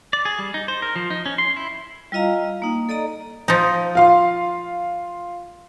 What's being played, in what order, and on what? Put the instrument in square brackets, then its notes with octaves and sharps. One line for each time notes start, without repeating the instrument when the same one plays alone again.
[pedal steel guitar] D5
G#4
G3
D#4
C5
A#4
F3
D#4
C#4
C6
E4
[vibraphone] G3 E4 F4 D#5 F5 A#5
A#3 D#4
A4 D5 D#5 A#5
[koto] F3 D#4
[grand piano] F4 F5 C6